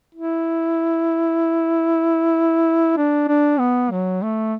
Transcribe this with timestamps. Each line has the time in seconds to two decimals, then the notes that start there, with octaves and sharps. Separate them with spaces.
0.15 E4
2.97 D4
3.28 D4
3.59 B3
3.91 F#3
4.23 A3